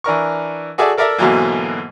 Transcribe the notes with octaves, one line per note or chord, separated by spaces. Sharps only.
E3 D4 A#4 C#6
F#4 G#4 A4 D5 E5 G#5
A4 A#4 D5 E5 A#5
G#2 B2 D3 E3 F#3 A#3